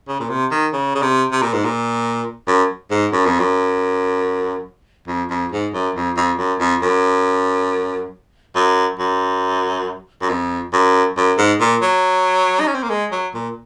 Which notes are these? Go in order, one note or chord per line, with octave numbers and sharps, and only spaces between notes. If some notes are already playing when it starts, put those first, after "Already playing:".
C#3
A#2
C3
D#3
C#3
C#3
C3
C3
A#2
G#2
A#2
F#2
G#2
F#2
F2
F#2
F2
F2
G#2
F#2
F2
F2
F#2
F2
F#2
F#2
F#2
F#2
F2
F#2
F#2
G#2
A#2
F#3
D#4
C#4
C4
A#3
G#3
F#3
A#2